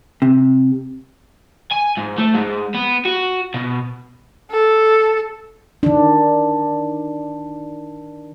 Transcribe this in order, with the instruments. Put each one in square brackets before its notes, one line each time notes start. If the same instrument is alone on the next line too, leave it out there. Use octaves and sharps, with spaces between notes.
[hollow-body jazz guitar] C3
[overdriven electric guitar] G#5
G#2
A3
G#2
B3
F#4
B2
[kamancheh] A4
[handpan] D#3 D4